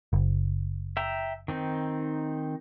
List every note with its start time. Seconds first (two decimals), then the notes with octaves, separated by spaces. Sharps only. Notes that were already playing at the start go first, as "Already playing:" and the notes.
0.13 F#1
0.97 E5 G5 A#5
1.48 D#3 C4 D#4